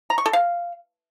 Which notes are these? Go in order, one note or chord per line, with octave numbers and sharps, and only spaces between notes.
A#5
C#6
A4
F5